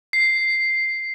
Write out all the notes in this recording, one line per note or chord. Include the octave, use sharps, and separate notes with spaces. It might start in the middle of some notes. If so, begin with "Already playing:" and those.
C7